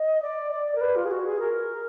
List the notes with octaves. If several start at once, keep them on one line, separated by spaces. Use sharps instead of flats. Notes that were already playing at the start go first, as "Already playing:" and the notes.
Already playing: D#5
D5
D5
A#4
B4
F4
G#4
F#4
G#4
A#4